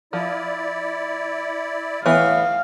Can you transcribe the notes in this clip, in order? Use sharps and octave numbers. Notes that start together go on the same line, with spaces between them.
F3 E4 D5
A2 E3 B3 C#5 E5 F5